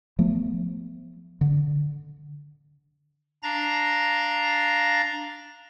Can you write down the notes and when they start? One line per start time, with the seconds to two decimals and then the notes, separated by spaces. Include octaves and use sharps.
0.19 F3 A3 B3
1.41 D3
3.43 D4 F5 A#5 A6 A#6